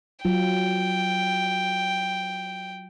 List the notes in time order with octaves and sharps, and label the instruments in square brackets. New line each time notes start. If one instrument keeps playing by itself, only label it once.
[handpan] F#3 F4 [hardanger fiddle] G5